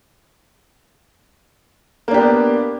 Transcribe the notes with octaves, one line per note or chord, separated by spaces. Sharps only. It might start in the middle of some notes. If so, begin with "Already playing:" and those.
A#3 B3 D4 G4